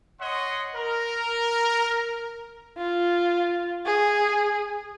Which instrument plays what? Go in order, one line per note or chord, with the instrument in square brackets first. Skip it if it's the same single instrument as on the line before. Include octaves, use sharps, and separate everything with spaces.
[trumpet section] C#5 D#5 F#5 C6
A#4
[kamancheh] F4
G#4